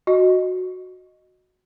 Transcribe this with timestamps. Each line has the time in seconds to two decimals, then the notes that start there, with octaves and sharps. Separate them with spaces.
0.07 F#4 D#5